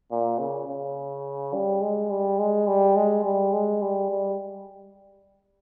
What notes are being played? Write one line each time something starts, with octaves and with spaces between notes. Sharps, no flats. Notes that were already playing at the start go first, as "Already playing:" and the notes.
A#2
C#3
C#3
G3
G#3
G3
G#3
G3
G#3
G3
G#3
G3
G3